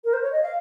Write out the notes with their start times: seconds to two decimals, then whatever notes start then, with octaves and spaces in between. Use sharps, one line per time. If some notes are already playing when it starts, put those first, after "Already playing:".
0.05 A#4
0.13 C5
0.23 C#5
0.32 D#5
0.43 F5